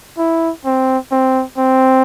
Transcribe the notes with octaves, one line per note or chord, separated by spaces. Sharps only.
E4
C4
C4
C4